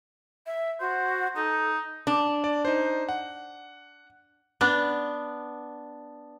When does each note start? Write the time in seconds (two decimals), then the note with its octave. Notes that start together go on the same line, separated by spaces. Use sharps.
0.46 E5
0.80 F#4 C5
1.36 D#4 A4
2.07 D4
2.44 D5
2.65 D#4 C5
3.09 F#5
4.61 B3 D4